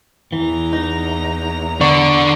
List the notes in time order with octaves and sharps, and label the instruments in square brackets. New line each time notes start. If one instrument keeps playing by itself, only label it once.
[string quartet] E2 A#5 [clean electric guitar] E3
[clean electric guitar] D#4
[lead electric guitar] D3 [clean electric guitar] B3 [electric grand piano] D5 C#6